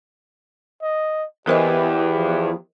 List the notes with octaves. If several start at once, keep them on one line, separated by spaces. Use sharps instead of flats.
D#5
E2 E3 G4 A#4 C5 D#5
F3